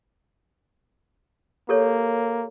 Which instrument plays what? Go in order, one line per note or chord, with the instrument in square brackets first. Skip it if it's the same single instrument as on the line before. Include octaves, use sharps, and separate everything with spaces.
[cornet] A#3 [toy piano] G4 A4 C#5